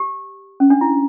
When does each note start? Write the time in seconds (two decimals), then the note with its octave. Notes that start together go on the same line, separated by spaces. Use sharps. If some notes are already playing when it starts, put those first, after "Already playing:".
Already playing: G4
0.60 C#4
0.70 D4
0.81 E4